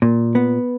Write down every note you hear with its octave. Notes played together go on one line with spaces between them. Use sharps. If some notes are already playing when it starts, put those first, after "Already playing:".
A#2
B3